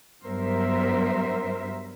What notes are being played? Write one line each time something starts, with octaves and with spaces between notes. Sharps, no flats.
G2 F#3 B3 A#4 C5 E5